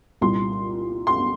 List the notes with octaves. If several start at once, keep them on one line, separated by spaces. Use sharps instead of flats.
C2 A#2 G3 C6
C6